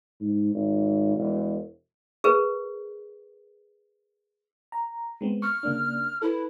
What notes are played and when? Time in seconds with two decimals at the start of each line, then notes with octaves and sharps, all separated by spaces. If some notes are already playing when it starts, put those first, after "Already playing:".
0.21 G#2
0.55 G#1
1.16 E1
2.24 G#4 A#4 B4
4.72 A#5
5.21 G#3 B3 C4
5.42 C#6 F6
5.63 C#3 A#3 D4
6.22 E4 A4 B4